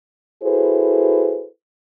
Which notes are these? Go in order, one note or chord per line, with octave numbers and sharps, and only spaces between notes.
E4 F#4 G#4 A4 B4 C5